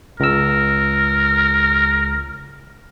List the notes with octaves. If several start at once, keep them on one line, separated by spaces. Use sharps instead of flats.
C#2 A#4 E6